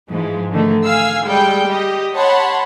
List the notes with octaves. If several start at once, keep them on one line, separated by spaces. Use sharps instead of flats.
G#2 E3 F3 G#3
D3 D#3 A3
F5 G#5 E6 C7
G3 G#3 G5
G4 D#5
C#5 F#5 A5 B5 C6